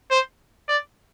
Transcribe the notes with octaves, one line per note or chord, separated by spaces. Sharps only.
C5
D5